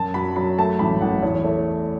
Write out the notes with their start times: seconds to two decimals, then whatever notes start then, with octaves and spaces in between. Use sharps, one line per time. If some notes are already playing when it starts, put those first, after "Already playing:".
Already playing: F#2 A5
0.14 F#3 B5
0.36 F#3 B5
0.58 A3 A5
0.79 A1 B5
1.01 A1 F#5
1.22 E2 C#5
1.44 A3 C#5